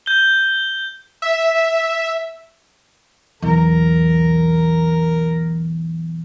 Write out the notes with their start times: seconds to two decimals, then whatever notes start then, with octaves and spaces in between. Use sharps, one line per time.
0.06 G6 G7
1.22 E5
3.42 B1 E2 A#4 A#5